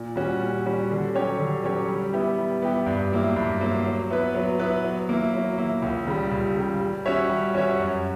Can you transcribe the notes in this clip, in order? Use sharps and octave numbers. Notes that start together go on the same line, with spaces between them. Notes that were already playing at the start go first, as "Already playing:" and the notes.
Already playing: A#2
G3 C#4 F#4
A#2
G3 C#4 F#4
D3
F#3 C#4 G4 C#5
D3
F#3 C#4 G4 C#5
G3
B3 E4 G4
G3
B3 E4 G4
G2
F#3 A#3 E4
G2
F#3 A#3 E4
F#3
B3 E4 B4
F#3
B3 E4 B4
F#3
A#3 E4
F#3
A#3 E4
C#2
C#3 G3
C#2
C#3 G3
G3
C#4 F#4 C#5 E5
G3
C#4 F#4 C#5 E5
F#2